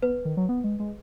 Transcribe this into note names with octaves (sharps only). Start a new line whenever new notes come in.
B3 B4
D#3
F#3
B3
G#3
G#3